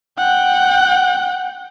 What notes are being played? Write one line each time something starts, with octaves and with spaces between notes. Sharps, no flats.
F#5 G5